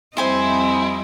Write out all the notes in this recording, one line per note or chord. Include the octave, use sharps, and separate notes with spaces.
F2 G3 C4 E4 C5 D#5 G#5 C6